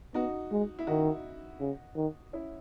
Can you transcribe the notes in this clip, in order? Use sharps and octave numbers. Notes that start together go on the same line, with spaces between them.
B3 D#4 F#4
G#3
E4
D#3 D#4 F#4
C#3
D#3
C#4 E4